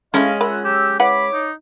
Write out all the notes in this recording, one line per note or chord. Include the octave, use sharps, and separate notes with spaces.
G#3 A3 C#4 E4 D#5 F5
F4 A#4 E5 F#5 B5
F#3 G4 E6
E4 B4 C#5 F#5 B5 D6
D#4